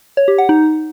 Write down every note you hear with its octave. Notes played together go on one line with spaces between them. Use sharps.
C#5
G4
F#5
D#4